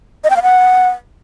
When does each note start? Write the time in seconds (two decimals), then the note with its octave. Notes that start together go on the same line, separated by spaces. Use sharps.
0.24 D#5
0.30 G5
0.36 F5
0.43 F#5